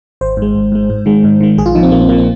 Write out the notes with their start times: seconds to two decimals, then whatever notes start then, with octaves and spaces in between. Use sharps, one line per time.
0.21 G#1 C5
0.37 G#2 G#3
0.55 G#1
0.72 G#2 G#3
0.90 G#2
1.06 D#3 G#3
1.24 G#2
1.41 D#3 G#3
1.58 A#1 G#4
1.66 F4
1.75 A#2 F3 D#4
1.83 C4
1.92 A#1 A#3
2.01 C4
2.09 A#2 F3 A#3
2.18 C4